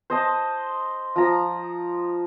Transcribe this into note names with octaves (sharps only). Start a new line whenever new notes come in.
C5 D#5 A5
F3 A#5